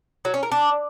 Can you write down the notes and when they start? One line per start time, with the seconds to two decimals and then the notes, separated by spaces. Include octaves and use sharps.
0.25 F#3
0.34 C#4
0.43 A#4
0.52 D4